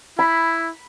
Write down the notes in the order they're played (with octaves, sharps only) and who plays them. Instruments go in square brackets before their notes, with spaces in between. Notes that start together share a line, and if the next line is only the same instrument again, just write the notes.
[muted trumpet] E4 [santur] B5